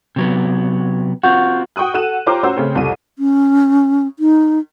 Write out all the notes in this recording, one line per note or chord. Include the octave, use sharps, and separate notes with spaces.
C3 F#3 B3
C4 F4 F#4 F#5 C#6 G6
F#4 G5 C#6 D#6 F#6
F#4 A4 F#6 D#7 E7
F4 G4 C5 C#5 A#5 D6
C#4 F#4 C5 E6
C#3 A3 C4 C#4
C2 F2 A4 D#7
C#4
D#4